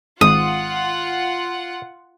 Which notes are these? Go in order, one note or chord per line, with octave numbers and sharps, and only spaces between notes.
G#1 G#2 F4 F#5 D#6